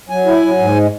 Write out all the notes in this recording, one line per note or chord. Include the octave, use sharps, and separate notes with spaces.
F#3 G#5
E4
F#3
G#2
G#3